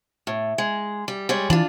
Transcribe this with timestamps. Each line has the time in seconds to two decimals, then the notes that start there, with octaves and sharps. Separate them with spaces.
0.27 A2
0.58 G#3
1.08 G3
1.29 G3 G#3 C#5
1.50 E3 D4 F4